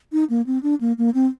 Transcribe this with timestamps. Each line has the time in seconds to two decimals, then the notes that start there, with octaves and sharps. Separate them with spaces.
0.12 D#4
0.30 A#3
0.46 C4
0.63 D4
0.81 A#3
0.98 A#3
1.14 C4